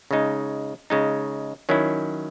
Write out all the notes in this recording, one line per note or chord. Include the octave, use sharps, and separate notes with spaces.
C#3 G#3 D#4
C#3 G#3 D#4
D#3 F#3 C#4 E4